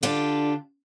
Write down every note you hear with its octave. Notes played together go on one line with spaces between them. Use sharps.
D3 D4 F4 G4